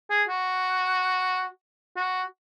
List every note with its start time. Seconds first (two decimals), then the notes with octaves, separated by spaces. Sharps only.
0.10 G#4
0.28 F#4
1.96 F#4